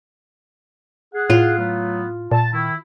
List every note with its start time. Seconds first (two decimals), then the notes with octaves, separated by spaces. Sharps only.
1.14 G#4 F#5
1.30 A2 F4
1.58 F#3 A3 B3
2.32 A#2 A5
2.53 D#3 E4